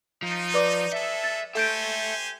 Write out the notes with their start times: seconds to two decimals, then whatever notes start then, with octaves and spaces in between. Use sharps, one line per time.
0.23 F3 D#4
0.54 B4 D5 D6
0.93 G#3 A4 E5
1.24 A6
1.55 G4 A4 C5 E5 G#5 A5 G6 D7